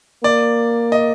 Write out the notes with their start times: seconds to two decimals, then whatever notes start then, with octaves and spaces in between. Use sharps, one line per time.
0.24 A#3 D5
0.92 D#5